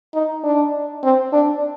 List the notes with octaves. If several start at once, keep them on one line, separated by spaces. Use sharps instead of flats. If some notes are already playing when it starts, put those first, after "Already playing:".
D#4
D4
C4
D4